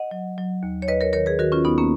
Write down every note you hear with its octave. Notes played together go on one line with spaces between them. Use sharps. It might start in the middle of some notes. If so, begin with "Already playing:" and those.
Already playing: D#5 F#5
F#3
F#3
D#2
C#5
D#2 B4 D#5
A#4 C#5
D#3 A#4 C#5
G#4 B4
D#3 F#4 A#4
C#4 F4
D#2 B3 D#4
A#3 C#4